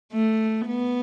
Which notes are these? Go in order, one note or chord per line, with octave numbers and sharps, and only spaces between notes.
A3
B3